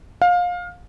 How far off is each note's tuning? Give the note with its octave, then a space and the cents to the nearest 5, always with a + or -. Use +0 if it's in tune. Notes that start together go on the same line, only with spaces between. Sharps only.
F5 +25